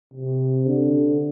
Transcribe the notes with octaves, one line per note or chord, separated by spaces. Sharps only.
C3
D3